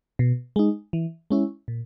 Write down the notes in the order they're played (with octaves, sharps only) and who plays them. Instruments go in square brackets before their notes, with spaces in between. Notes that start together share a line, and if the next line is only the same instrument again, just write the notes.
[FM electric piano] B2
G#3 D#4
E3
G#3 C#4 E4
A#2